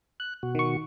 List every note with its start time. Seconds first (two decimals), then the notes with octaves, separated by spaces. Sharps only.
0.20 F#6
0.43 B2 F#4
0.55 D#3 C#6